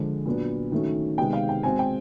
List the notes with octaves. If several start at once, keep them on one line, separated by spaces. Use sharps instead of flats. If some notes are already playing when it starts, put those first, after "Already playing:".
Already playing: D3 F3 G#3
A#2 F#3 B3 D4
D#3 F#3 A3 C#4
C3 D#3 G#3 B3 G5
F5
G5
B2 G#3 C4 G#5
G5